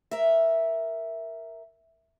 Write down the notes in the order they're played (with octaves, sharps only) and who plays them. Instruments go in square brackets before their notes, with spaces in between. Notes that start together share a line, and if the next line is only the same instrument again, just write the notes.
[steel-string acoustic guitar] A#4 E5